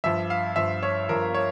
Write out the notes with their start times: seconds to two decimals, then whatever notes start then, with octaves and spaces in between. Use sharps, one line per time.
0.04 G2 F3 E5
0.30 F5
0.56 G2 F3 E5
0.83 C#5
1.09 G2 F3 A#4
1.34 C#5